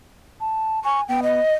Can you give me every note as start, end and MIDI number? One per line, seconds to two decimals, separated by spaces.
0.40 0.80 81
0.85 1.03 80
0.85 1.01 85
1.09 1.39 59
1.09 1.21 79
1.23 1.54 75